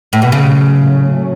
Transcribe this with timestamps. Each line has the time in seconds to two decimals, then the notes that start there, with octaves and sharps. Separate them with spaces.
0.13 A2
0.22 B2
0.31 A2 C#3 F#3 A3 C#4